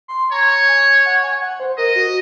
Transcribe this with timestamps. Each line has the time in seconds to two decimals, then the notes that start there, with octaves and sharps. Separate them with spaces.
0.08 C6
0.32 C#5 A#5
0.68 G#5
1.05 F#5
1.24 G#5
1.42 F#5
1.60 C5
1.78 A#4 D#5
1.96 F#4